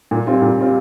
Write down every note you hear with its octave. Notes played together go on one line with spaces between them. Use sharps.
A#2
G3 C4 F4
A#2
G3 C4 F4